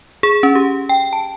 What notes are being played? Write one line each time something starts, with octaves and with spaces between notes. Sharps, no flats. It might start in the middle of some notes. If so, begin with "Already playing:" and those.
G#4
C#4
G4
G5
A5